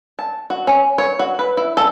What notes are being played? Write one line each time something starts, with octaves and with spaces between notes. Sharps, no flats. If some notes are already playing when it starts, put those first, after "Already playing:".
A5
F#4
C#4
C#5
F#4
B4
E4
A4